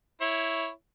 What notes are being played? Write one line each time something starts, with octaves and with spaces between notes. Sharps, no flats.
E4 C#5